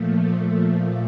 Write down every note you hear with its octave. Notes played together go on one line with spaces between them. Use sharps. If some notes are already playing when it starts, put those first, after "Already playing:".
Already playing: A#2 F3 A3
A3